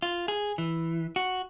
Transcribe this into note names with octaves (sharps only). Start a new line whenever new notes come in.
F4
G#4
E3
F#4